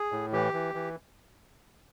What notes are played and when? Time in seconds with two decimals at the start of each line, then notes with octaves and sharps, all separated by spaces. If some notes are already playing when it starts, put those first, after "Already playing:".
Already playing: G#4
0.12 A2
0.33 E3 G4
0.53 E3
0.75 E3